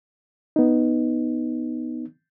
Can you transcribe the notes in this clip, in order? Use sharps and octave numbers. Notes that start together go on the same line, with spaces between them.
B3 D#4